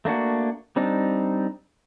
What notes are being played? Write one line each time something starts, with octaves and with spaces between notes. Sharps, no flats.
A3 A#3 D4 F#4
G3 C4 D4 D#4